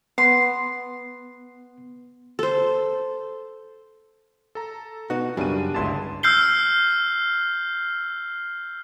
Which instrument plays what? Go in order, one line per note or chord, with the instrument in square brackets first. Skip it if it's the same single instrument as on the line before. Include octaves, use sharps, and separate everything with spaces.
[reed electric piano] B3 [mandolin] C6
[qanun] A4 C5
[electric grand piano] A4 A#5
[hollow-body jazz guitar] B2 B3 D#4 [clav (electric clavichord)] F#4
[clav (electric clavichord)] F#2 C#3 [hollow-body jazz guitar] G3 [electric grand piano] D4 D#7
[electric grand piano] G1 D4 C6 [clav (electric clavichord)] C#2 E4 A5
[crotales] E6 F6 G6 C7 G7